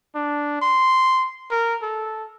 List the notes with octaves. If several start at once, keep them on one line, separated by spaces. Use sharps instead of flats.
D4
C6
A#4
A4